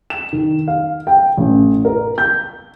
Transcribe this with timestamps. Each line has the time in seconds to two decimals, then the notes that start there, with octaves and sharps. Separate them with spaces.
0.10 E7
0.33 D#3
0.68 F5
1.07 G5
1.37 A1
1.85 A#4
2.18 G6